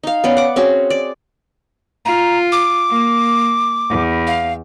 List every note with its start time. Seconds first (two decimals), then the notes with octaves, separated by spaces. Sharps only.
0.03 D#4 F5
0.24 B3 C#4 D5
0.37 F#5 D6
0.56 C4 C#4 F#4 G#4
0.90 D5
2.05 F4 A#5
2.52 D6
2.89 A#3
3.90 E2
4.27 F5